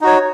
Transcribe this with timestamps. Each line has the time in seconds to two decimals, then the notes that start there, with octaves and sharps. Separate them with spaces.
0.01 D#4
0.04 F#4
0.07 C#5